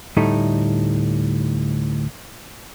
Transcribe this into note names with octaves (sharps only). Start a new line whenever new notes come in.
D2 A2 G3 A3 D#4